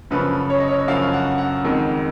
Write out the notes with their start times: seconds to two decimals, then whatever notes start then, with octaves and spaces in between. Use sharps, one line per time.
0.10 F#2 C#3 F3 B4
0.50 C#5
0.59 D#5
0.68 C#5
0.82 D#5
0.87 F#2 C#3 F3 F5
1.13 F#5
1.38 F#5
1.64 F2 D#3 G#3